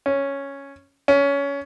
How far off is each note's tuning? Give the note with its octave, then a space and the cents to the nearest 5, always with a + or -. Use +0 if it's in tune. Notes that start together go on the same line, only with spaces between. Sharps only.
C#4 +0
C#4 +20